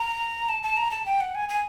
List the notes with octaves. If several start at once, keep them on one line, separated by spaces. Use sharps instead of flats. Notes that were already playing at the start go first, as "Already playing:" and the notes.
Already playing: A#5
A5
A5
A#5
A5
G5
F#5
G#5
G#5